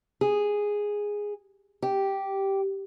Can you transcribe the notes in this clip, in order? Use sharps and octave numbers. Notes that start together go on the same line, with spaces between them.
G#4
G4